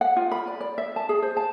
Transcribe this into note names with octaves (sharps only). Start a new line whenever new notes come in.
F#5
F4
B5
D5
D5
E5
A5
G#4
C5
A5